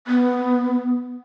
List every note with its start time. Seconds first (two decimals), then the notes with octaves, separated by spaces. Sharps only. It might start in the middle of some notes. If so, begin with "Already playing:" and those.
0.07 B3